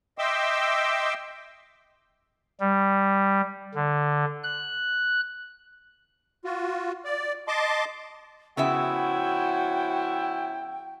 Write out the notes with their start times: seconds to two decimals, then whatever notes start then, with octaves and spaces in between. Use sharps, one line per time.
0.18 D#5 E5 G5 C6 D6 E6
2.60 G3
3.75 D3
4.44 F#6
6.45 F4 F#4
7.05 D5
7.48 D#5 A5 C6 D6
8.57 C#3 F3 B3 C#4 E4 F#4 E5 G5